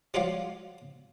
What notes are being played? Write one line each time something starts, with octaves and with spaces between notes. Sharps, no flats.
F3 F4 F#4 C#5 D5 F5